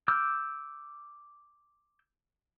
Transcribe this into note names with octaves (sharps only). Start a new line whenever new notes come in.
D6 E6 F6 G6